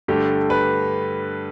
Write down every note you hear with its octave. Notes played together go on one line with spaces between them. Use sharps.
G2 D3 A3 G4
B4